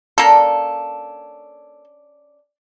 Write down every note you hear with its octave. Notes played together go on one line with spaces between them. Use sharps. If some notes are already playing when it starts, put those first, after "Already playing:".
A#3 C#4 D4 A4